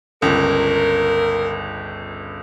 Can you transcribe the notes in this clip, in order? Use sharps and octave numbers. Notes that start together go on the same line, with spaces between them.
G1 C#2 A#4